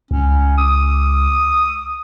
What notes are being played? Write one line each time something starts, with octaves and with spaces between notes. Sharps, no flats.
C#2 C#4
D#6